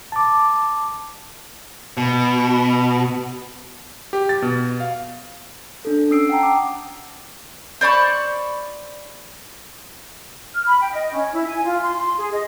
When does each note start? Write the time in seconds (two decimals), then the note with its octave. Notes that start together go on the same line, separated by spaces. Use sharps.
0.12 A5 D6
1.97 B2
4.13 G4
4.29 A6
4.42 B2
4.80 F5
5.85 D4 A4
6.11 C#4 D#6 E6 C7 D7
6.29 F#5 G5 A5 A#5
6.43 D6
7.81 C5 D5 B5 C#6
10.54 F6
10.66 B5
10.81 G5
10.93 D#5
11.12 C#4
11.33 E4
11.47 G#5
11.64 F4
11.82 C6
11.97 C6
12.18 G#4
12.32 D#5